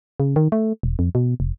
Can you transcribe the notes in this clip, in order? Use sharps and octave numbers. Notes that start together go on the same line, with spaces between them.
C#3
D#3
A3
E1
F2
B2
F1